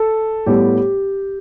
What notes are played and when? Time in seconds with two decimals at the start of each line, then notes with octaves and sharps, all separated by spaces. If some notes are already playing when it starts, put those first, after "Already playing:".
Already playing: A4
0.46 A2 G3 B3 G4